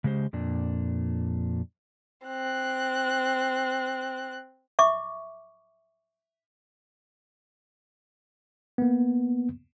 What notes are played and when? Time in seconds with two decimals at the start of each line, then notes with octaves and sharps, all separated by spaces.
0.04 C#3 G#3 G4 C5
0.33 F2 A#2 D4
2.27 C4 F#6
4.79 E5 C#6 D6
8.78 A#3 B3